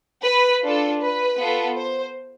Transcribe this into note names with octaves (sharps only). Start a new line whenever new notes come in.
B4
D4 F4 A4
B4
B3 F4 A4
C5